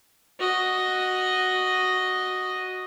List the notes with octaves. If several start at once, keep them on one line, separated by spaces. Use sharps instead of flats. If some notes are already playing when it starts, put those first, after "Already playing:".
F#4 D#5